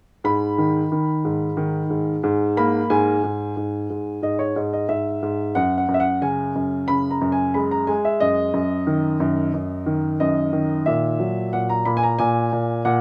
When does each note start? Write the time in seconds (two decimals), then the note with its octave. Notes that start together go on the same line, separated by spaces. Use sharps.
0.24 G#2 B5
0.58 D#3
0.92 D#3
1.25 G#2
1.57 D#3
1.90 G#2
2.23 G#2
2.57 A#3 B5
2.90 G#2 G#5
3.24 G#2
3.57 G#2
3.90 G#2
4.22 G#2 D#5
4.39 C#5
4.56 G#2 D#5
4.73 D#5
4.89 G#2 E5
5.23 G#2
5.55 F#2 F#5
5.78 F#5
5.88 F#2
5.94 E5
6.00 F#5
6.21 C#3 G#5
6.55 F#2
6.88 C#3 B5
7.11 A#5
7.21 F#2
7.32 G#5
7.54 G#3 B5
7.71 A#5
7.87 G#3 G#5
8.05 E5
8.20 F#2 D#5
8.54 F#2
8.87 D#3
9.20 F#2
9.54 F#2
9.86 D#3
10.20 F#2 D#5
10.53 D#3
10.86 A#2 E5
11.20 F#3
11.53 A#2 F#5
11.69 A#5
11.85 A#2 B5
11.97 G#5
12.03 A#5
12.19 A#2 G#5
12.53 A#2
12.85 A#2 F#5